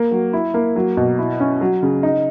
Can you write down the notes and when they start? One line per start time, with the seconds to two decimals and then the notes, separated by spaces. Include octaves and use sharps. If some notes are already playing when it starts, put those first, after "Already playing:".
Already playing: A#3
0.11 F#3
0.33 E4
0.54 A#3
0.76 F#3
0.97 B2
1.19 E4
1.40 C#4
1.61 F#3
1.83 C#3
2.03 D#4